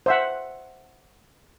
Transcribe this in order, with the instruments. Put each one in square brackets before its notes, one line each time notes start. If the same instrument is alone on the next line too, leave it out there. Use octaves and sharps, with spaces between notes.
[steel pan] C5 E5 F#5